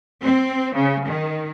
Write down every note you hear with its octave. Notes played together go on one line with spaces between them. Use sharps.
C4
C#3
D#3